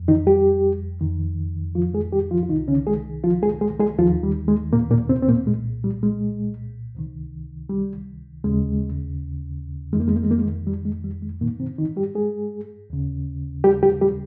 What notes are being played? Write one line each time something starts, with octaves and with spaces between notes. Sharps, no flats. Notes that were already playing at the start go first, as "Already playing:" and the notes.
Already playing: F2
D#3 D#4
G3 G4
F2 D#3
F3 F4
G#3 G#4
G3 G4
F3 F4
F4
C2 C3 D#3 D#4
C#3 C#4
G#3 G#4
F3 F4
G#3 G#4
G#3 G#4
G#3 G#4
D#2 D#3 F3 F4
G3
G#3
A#2 A#3
A#2 A#3
C3 C4
C4
A#2 A#3
C2 A#2 G#3
G3
G#3
C#2 C3 D#3
G3
D#2 C#3 G#3
F2 D#3 G#3
A#3
G#3
A#3
G#3
A#3
G#3
G3
G#3
G3
G#3
G2 A#2 D#3 A#3
C3 C4
D#3 D#4
G3 G4
G#3 G#4
D#2 C#3
G3 G4
G3 G4
G3 G4